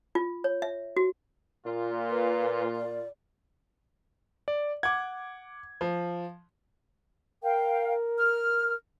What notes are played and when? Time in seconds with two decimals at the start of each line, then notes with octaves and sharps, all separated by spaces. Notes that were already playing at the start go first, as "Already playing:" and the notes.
0.15 F4
0.44 C#5
0.62 E5
0.97 F#4
1.66 A#2 F4
2.10 B4
2.75 D5
4.48 D5
4.83 F#5 D6 G#6
5.81 F3
7.43 A#4 F5 G5
8.19 F6